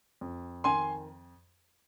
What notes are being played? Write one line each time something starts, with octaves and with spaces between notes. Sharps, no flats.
F2
D#3 G#5 C6